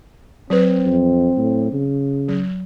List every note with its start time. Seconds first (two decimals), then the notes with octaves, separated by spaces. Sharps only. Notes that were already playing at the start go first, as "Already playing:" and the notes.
0.50 F#3 C4 B4
0.85 F2
1.36 A2
1.72 C#3
2.28 F#3